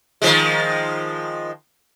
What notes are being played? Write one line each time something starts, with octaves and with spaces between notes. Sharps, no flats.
D#3 F3 G#3